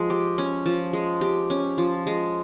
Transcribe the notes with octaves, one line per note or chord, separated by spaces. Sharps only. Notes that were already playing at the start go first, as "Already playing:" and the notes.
Already playing: F3 G#3
G4
C#4
F3
G#3
G4
C#4
F3
G#3